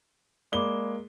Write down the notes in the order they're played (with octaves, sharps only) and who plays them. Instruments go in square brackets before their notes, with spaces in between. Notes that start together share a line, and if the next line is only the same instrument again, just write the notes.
[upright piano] G#3 A#3 G7 [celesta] D5 B5 D6